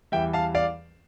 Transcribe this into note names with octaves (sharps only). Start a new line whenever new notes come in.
E2 E3 G3 E5 G5
F5 A5
D5 F5